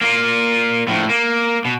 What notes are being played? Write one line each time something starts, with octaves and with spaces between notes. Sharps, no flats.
A#3 F4
A2 F3
A#3
B2